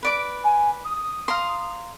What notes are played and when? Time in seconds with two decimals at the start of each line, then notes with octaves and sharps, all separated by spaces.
0.03 B4 D5 D6
0.44 G#5
0.84 D#6
1.28 F5 A#5 C6